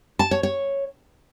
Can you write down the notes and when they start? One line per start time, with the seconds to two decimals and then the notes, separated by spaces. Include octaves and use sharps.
0.19 A5
0.31 C#5
0.43 C#5